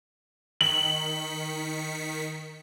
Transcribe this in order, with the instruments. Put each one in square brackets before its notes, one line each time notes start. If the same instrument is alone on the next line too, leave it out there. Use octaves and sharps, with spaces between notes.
[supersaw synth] D#3 B6 C#7 [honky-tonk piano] F#7